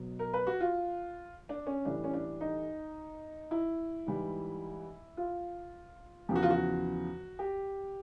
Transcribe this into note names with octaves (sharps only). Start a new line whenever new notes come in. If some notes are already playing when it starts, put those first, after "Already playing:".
Already playing: B2 F#3
A#4
B4
F#4
F4
D4
C#4
A2 E3 G3 D4
C#4
D4
D#4
E4
G#2 E3 G3
F4
E2 C#3 F3 G4
F#4
F4
F#4
G4